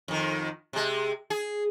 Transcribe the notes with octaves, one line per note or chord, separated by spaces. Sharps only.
F2 D#3
C3 G#3
G#4